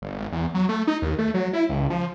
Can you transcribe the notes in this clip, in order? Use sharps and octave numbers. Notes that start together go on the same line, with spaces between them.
G1
G#1
E2
F#3
A3
D#4
D#2
A3
F#3
E4
C#2
F3